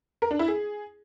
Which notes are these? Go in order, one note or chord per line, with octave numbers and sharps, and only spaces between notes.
A#4
D4
E4
G#4